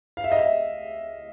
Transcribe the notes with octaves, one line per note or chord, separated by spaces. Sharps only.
F5
E5
D#5
E5